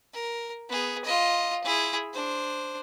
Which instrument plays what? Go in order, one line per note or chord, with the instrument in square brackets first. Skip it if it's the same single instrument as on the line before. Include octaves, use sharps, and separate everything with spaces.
[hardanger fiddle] A#4
B3 G#4
F4 D#5
E4 G#4
D4 C5